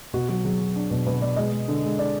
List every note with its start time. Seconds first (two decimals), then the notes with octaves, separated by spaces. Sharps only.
0.13 B2 F#4
0.29 F#3 F#4
0.44 F#3 G#4
0.61 F#3
0.76 D4
0.91 B2
1.06 B2 B4
1.21 B2 D5
1.36 G#3 D#5
1.52 G#3
1.68 D3
1.84 G#3
1.99 D4 D5